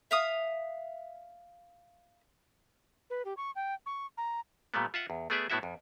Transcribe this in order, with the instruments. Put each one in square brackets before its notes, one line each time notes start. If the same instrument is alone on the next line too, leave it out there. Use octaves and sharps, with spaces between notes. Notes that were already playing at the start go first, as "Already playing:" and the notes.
[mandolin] E5 F5 D#6
[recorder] B4
G4
C#6
G5
C#6
A#5
[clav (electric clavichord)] A#2 G3 A3 B3
F4 E5 F#5
E2
A3 B3 G#4 D5 E5
A2 B3 E4 F#4 E5
F2